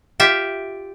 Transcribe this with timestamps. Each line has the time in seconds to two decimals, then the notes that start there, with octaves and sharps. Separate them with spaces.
0.20 F4 G4 E5